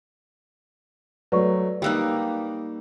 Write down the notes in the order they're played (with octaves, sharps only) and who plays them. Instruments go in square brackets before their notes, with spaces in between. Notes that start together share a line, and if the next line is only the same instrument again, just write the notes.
[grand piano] F#3 A3 [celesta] B4 D5 C#6
[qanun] G3 A#3 D#4 [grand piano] F5 E6 F#6